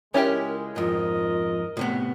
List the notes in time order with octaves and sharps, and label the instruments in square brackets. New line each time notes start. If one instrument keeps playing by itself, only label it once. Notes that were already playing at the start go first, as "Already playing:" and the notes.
[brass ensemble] C#2 G#3 [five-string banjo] C#4 E4 G4 [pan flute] A#4
[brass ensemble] A#1 A#4 D#5 [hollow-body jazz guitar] F2 G#2 [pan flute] F4
[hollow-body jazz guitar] A2 C3 B3